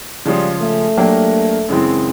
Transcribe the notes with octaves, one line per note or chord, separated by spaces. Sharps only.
C#3 F3 G3 G#3 C#4 F4
A3
F#3 A#3 D4 G4 A#4
F#2 C#3 E3 G#3 C4